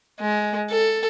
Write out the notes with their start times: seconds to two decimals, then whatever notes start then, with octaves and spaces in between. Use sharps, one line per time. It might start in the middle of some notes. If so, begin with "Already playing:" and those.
0.20 G#3
0.71 A4